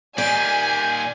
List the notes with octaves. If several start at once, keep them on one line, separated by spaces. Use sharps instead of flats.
A#2 D#3 G4 D5 G#5